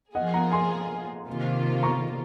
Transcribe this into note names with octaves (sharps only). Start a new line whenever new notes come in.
F3 A#3 F4 G#4 D#5 F#5
F#5 A#5
G#5 C6
C3 D#3 A#3 F4
A#5 C#6